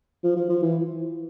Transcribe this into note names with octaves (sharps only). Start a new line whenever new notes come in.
F3
F3
F3
E3